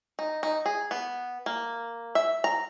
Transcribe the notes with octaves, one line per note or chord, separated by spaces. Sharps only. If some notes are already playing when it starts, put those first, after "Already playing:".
D#4
D#4
G#4
B3
A#3
E5
A#5